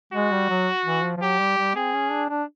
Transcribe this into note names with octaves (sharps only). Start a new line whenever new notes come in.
G#3 F#4
G3
F#3
E3
F3
F3
F#3 G4
G3
G3
C4 G#4
C#4
D4
D4